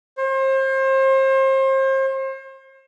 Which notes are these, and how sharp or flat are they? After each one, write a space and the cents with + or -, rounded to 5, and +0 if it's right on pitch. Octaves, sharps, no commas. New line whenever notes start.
C5 +35